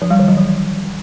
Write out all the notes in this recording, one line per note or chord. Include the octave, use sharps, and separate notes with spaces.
F3
G3
D#3
F#3
E3